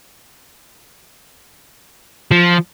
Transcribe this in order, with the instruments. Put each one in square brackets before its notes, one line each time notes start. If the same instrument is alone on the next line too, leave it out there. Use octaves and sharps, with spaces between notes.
[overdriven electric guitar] F3